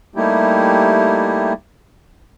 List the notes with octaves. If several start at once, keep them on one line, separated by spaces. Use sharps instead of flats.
G3 A3 A#3 D#4 E4 G4